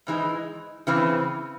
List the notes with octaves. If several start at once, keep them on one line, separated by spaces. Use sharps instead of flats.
G#2 E3 G#3 D#4
C#3 E3 C4